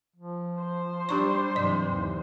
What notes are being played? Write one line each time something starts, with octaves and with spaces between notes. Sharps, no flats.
F3
C5
G3 D4 G4 A#5 C#6
G2 C3 E3 F#3 D5
D#2 E3